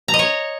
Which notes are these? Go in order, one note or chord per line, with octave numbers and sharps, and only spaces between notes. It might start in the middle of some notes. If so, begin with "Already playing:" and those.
A#5
D#5
C#5